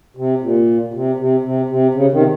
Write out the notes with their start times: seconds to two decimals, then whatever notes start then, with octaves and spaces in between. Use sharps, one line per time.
0.17 C3
0.42 A#2
0.94 C3
1.18 C3
1.44 C3
1.70 C3
1.94 C#3
2.12 C3 D#3